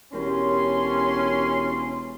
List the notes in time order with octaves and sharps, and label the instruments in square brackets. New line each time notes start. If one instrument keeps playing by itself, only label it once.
[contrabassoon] E1 [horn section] C#4 C6 [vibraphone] G4 A#4 [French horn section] C#5